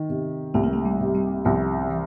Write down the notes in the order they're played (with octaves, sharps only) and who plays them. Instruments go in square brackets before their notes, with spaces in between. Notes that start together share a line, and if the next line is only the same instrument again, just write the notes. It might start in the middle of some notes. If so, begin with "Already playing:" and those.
Already playing: [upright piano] D#3
C3
[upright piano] C2 [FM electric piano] A3
[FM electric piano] A#3
A3
G3
[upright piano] C3
[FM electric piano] G3
[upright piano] C2 [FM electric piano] F3
[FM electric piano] E3